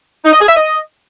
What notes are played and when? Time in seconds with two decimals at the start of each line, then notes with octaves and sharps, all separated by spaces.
0.25 D#4
0.33 D#5
0.40 G#4
0.48 E5
0.56 D#5